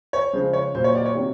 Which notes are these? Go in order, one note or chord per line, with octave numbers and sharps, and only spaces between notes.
C#5
C#3 F3 G#3 C5
C#5
A#2 F#3 C5
C#5
D5
C#5
C3 D#3 F#3